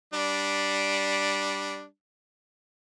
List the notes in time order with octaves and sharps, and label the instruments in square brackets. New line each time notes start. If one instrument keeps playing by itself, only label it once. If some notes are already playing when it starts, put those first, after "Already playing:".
[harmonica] G3 D4